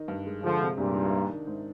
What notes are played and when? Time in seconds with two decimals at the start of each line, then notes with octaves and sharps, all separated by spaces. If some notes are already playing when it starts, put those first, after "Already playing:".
Already playing: D#3 D#4
0.08 G2
0.26 G#3
0.43 D3 F3 G#3
0.61 C3
0.77 C2 G2 A#2
0.95 D#3
1.13 D4
1.29 D#3
1.47 G#2